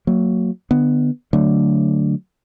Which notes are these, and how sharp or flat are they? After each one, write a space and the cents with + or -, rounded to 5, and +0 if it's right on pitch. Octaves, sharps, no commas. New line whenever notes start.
F#3 +0 A#3 -25
D3 +25 B3 +0
D3 +0 F#3 +0 A3 +10